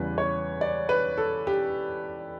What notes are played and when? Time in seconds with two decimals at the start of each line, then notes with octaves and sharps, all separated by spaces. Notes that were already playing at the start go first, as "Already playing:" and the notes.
Already playing: E2 C#3 G3 B4
0.18 C#5
0.61 D5
0.89 B4
1.18 A4
1.47 G4